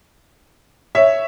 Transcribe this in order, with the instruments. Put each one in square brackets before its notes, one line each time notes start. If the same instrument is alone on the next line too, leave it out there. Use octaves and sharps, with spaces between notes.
[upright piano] C#5 E5